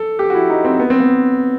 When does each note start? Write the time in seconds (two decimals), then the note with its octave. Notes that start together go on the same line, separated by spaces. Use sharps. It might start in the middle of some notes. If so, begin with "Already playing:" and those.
Already playing: A4
0.19 G4
0.30 F#4
0.35 E4
0.50 D#4
0.65 C4
0.80 B3
0.90 C4
1.00 B3